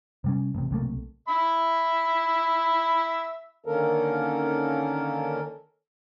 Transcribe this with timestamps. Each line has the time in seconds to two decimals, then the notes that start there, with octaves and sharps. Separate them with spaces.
0.24 C3 G3 C#4
0.55 A1 C3
0.71 B1 C3 A3 A#3
1.28 E5 B5
3.66 D3 D#3 A#3 C#4 A4 A#4